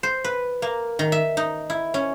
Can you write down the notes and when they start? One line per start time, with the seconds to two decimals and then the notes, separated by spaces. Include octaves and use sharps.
0.03 C5
0.24 B4
0.62 A#3
0.99 D#3
1.12 E5
1.37 D#4
1.70 E4
1.94 C#4